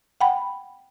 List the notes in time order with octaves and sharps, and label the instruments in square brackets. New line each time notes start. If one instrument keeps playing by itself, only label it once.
[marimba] F#5 G5 B5